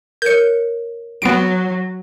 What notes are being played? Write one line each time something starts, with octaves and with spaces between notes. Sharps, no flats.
A#4 C#5 G6 C#7
F#3 B3 D7